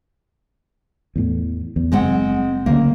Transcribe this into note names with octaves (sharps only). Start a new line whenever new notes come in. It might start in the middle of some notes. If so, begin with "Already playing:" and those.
E2 A2
E2
F#1 G#3 C4 F#5
D2 C#3 A#3